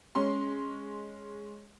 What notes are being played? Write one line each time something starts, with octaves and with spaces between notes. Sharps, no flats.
G#3 C#4 C6